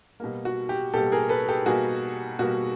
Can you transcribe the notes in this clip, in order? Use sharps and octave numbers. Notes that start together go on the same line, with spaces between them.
B2 G3 A#3
F#4
G4
B2 G3 A#3 G4 A4
G#4 A#4
A4 B4
G4 A4
B2 G3 A#3 F#4 G#4
B2 G3 A#3 F#4